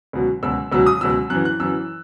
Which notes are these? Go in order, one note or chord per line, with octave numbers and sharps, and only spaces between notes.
C#2 B2 F#3
C#2 B2 F#3 E6
C#2 B2 F#3 E6
D#6
C#2 B2 F#3 E6
F#2 E3 F#6
F#6
F#2 E3 E6